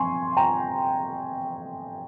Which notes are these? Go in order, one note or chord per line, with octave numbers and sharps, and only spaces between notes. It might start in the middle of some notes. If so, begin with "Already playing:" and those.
Already playing: F3 C4 G#5 C6 C#6
G5 A#5